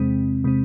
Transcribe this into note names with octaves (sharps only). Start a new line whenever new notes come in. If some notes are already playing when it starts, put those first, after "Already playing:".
Already playing: E2 C3 G#3 C4
C3 G#3 C4